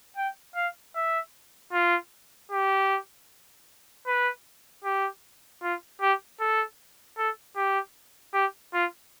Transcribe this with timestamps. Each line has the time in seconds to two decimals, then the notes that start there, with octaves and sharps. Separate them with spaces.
0.17 G5
0.56 F5
0.96 E5
1.73 F4
2.51 G4
4.07 B4
4.84 G4
5.62 F4
6.01 G4
6.40 A4
7.18 A4
7.56 G4
8.34 G4
8.74 F4